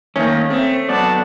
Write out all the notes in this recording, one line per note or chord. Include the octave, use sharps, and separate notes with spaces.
D#3 A3 A#3 C#4
A3 C4
F#3 B3 D5 F#5 A5